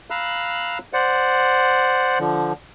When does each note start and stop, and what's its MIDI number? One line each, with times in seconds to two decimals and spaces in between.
0.10 0.78 77
0.10 0.78 82
0.10 0.78 83
0.10 0.78 88
0.10 0.78 90
0.93 2.19 72
0.93 2.19 74
0.93 2.19 78
2.19 2.53 50
2.19 2.53 53